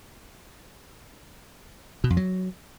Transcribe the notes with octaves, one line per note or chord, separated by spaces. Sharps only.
B2
F2
F#3